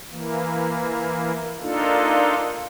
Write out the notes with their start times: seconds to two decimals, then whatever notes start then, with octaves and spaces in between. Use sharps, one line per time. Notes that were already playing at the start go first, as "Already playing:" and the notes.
0.11 E3 A#3
1.61 A#3 D4 D#4 F4 A4